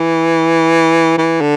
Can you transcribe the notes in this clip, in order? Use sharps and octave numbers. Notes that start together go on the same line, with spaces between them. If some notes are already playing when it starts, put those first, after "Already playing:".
Already playing: E3
E3
D3